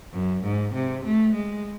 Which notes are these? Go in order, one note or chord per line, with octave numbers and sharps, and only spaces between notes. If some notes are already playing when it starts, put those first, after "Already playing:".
F#2
G#2
C3
A3
G#3